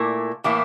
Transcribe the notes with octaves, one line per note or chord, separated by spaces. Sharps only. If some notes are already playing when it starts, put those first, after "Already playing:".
Already playing: A#2 A3 E4 A#4
A2 E3 A#3 E4